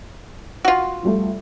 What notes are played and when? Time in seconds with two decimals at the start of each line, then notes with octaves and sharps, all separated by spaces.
0.65 F4 F#4
1.03 F3 G3 A3